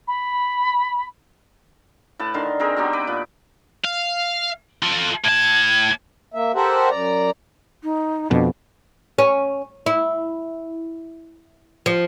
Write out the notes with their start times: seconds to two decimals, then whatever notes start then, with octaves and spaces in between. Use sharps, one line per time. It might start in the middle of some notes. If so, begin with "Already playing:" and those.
0.07 B5
2.19 A2 B4 A5
2.34 D3 D#3 A#4 C6
2.60 C4 G#4 A#4
2.76 F#3 B3 C4 G4
2.93 B4 D6
3.07 A#2
3.84 F5
4.83 F4 A4
5.25 A2 A5 G#6
6.34 A#3 E5
6.55 G4 A4 A#4 C5 E5 F#5
6.89 F#2 D5 A#5
7.83 D#4
8.31 F2 B2 D4
9.18 C#4
9.86 E4
11.86 F3